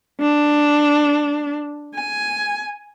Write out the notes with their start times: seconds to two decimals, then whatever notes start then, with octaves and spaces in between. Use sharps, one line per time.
0.21 D4
1.95 G#5